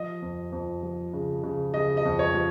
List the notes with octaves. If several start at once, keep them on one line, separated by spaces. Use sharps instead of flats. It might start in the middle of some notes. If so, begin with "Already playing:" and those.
Already playing: F3 D#5
F2
F2
F3
C#3
C#3
C#3 D#5
D#5
F2
C#5
F3